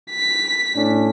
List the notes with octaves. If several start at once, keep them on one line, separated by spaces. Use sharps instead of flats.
B6
A2 C#4 D4